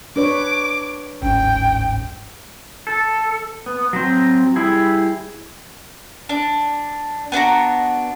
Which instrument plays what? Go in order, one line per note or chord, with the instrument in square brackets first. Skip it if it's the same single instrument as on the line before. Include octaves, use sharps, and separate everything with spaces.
[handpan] D4 B4 C#5 [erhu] D6
[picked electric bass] D1 G1 G#2 [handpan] C#4 [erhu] G5
[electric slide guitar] A4
B3
F#3 C4
G3 E4 G#4
[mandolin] D4
B3 D4 F#4 A#5